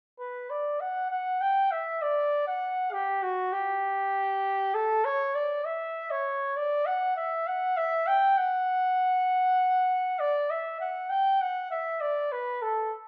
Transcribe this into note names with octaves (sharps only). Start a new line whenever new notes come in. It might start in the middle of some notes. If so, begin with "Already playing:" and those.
B4
D5
F#5
F#5
G5
E5
D5
F#5
G4
F#4
G4
A4
C#5
D5
E5
C#5
D5
F#5
E5
F#5
E5
G5
F#5
D5
E5
F#5
G5
F#5
E5
D5
B4
A4